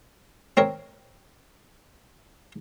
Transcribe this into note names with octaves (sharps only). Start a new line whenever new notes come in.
C4 A#4 C#5